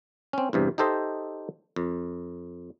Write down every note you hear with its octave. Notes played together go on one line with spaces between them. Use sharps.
C4 C#4
E2 G2 C3
D#4 G4 A4 C5 D#5 E5
F2